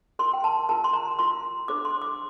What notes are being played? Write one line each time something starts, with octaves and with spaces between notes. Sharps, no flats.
F4 A#4 C6
G5
A5
F4 A#4 A5
C6
A#5
F4 A#4 C6
D4 A4 C5 D6
C6
D6